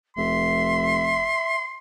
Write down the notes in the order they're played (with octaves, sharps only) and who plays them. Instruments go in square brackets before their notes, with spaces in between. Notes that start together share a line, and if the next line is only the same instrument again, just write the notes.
[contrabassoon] F1 [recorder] E5 [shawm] C6